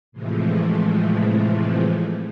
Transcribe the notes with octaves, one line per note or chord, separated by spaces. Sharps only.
A2 C3 E3 F3 G#3 A3